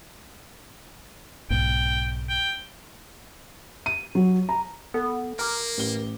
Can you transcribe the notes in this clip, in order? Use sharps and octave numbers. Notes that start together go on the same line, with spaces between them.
B1 G#2 B2 G5
G5
D#7
F#3
A#5
B3 A4
A#3 A#4 A#5 D6
A1 G7